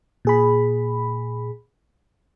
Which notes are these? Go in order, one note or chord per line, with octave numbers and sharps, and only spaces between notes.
A#2 G#4 B5